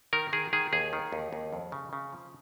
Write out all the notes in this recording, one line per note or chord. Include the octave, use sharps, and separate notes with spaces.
D#3 A#4
D#3 G#4
D#3 G#4
D#2 G#4
D#3
D#2
D#2
F2
C#3
C#3
F3